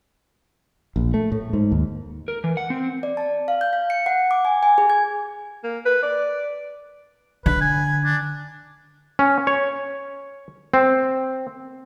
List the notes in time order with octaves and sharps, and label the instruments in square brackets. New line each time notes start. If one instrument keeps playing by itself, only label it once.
[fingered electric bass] A#1
A3
A2
G#2
D#2
[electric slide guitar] A#4
E3
F#5
C4
[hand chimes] D5
A5
F5
G6
F5
C#7
F#5
D6
G#5
G#5
G#4
G#6
[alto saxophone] A#3
B4
D5
[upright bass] D3 [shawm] B4
[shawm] G#5
D4
[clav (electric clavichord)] C#4
C#5
C4